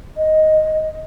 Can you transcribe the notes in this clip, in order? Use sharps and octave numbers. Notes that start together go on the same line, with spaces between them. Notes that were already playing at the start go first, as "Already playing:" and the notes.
D#5